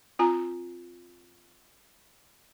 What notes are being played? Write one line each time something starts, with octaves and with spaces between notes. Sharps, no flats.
C4 F4 G#5 A#5